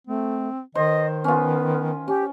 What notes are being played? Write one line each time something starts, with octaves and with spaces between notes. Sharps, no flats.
A3 C4
D#3 C5 D#5
B3 C#4 F4
C#4 G4